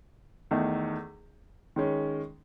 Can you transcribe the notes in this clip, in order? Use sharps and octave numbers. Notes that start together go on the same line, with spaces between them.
E2 D#3 A3 D#4
D#3 G#3 C#4